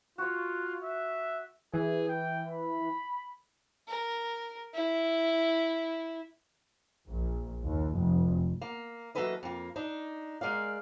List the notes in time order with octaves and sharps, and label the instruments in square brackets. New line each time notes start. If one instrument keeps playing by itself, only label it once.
[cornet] F4 [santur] F#4 C#5
[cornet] E5
[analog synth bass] E3 [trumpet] G#4
[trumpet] G5
B5
[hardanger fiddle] A#4
E4
[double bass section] A#1
D#2
F1
[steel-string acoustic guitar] A#3
E3 F#3 A#3 A4 B4 D#5
F2 A#3
D4 D#4
G#3 A#4 D5 F5